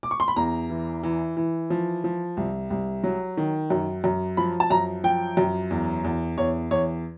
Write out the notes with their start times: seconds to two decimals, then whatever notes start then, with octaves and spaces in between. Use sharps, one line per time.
0.03 D6
0.11 C#6
0.20 C6
0.28 B5
0.36 E2 A#5
0.70 E3
1.03 E3
1.37 E3
1.70 F3
2.04 F3
2.37 C2
2.70 C2
3.04 F#3
3.37 D#3
3.70 F#2
4.04 F#2
4.37 F3 B5
4.60 A5
4.70 F#2 A#5
5.04 F3 G5
5.37 F#2
5.70 E2
6.04 E2
6.37 E2 C#5
6.71 E2 C#5